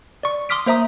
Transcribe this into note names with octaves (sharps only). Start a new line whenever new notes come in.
D5 C#6
C6 D6 D#6 F6 B6 D7
A#3 C5 E5 A#5 D#6